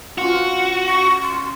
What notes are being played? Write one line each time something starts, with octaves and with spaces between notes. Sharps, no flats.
C#4 F4 F#4
C#6
C6